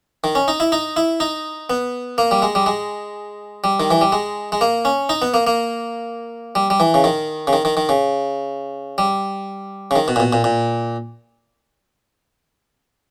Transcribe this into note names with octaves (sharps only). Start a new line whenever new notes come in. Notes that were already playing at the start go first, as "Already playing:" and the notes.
D#3
C#4
D#4
E4
D#4
E4
D#4
B3
A#3
G3
G#3
G3
G#3
G3
D#3
E3
G3
G#3
G#3
A#3
C#4
D#4
B3
A#3
A#3
G3
G3
E3
C#3
D#3
C#3
D#3
D#3
D#3
C#3
G3
C#3
D#3
B2
A#2
B2
A#2
A#2